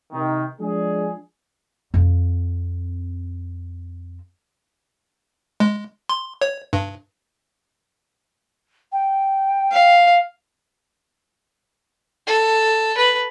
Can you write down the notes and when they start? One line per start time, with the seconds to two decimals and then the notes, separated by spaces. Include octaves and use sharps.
0.13 C3 D#3
0.60 F3 G#3 D4 G#4
1.94 F2 C4
5.60 G#3
6.09 C6
6.41 C#5
6.73 G2
8.92 G5
9.72 F5
12.27 A4
12.97 B4